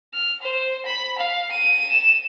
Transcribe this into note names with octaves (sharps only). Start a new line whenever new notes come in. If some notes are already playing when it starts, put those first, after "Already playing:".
F6
C5
B5
F5
D#7
E7